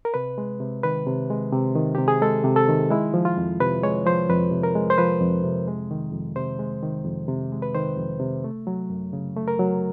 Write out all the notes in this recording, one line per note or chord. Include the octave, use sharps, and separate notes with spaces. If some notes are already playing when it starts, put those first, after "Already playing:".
A#4
C3 B4
G#3
C3
D#3 B4
C3
G#3
C3
D#3
C3 G4
G#4
G#3 A4
C3
A4
D#3
G#3 E4
F3
F4
F2
C3 B4
G#3 C#5
F3 C5
F2 B4
C3
A#4
G#3
C5
F3 B4
F2
C3
G#3
D#3
F2
C3 C5
G#3
D#3
F2
C3
G#3
B4
D#3 C5
F2
C3
A3
F#3
F#2
C#3
A3
A#4
F#3